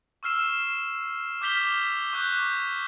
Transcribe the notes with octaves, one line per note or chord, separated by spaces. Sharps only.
C#6 E6 F6 C7 E7
D6 F6 G6 B6 F7 G7
C#6 D6 F#6 G6